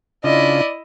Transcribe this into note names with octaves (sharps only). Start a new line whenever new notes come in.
C#3 D4 E4 F4 D5 D#5